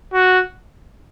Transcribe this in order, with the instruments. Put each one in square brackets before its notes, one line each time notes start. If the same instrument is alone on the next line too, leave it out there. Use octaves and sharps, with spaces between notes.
[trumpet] F#4